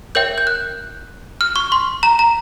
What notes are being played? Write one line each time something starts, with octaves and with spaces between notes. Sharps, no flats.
A#4 C#5 E5 G5 G6
G6
F#6
F6
C#6
C6
A#5
A#5